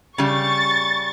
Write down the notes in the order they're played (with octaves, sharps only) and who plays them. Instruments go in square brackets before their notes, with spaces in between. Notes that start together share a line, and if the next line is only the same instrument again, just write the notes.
[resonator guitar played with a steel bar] C#3 G3 [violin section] C#6 A6